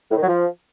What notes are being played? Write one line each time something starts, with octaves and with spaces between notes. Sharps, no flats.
A2
D#3
F#3
F3